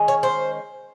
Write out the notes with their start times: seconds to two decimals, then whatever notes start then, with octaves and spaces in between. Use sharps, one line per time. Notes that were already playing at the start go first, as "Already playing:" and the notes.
Already playing: D#3 G#3 C#4
0.08 C#5
0.23 C5